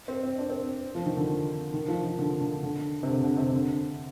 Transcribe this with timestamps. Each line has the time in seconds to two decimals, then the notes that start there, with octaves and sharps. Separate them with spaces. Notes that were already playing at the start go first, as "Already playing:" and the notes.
0.08 C4
0.23 C4
0.38 D4
0.50 C4
0.95 F3
1.06 D#3
1.17 D3
1.74 D#3
1.88 F3
2.03 D#3
2.19 D3
2.41 D3
2.63 D3
3.03 C3
3.08 D3
3.24 D3
3.37 C3
3.53 D3